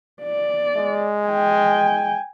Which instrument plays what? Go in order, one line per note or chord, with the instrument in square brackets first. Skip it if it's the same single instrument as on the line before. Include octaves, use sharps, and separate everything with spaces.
[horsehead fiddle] D5
[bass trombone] G#3
[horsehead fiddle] G5 G#5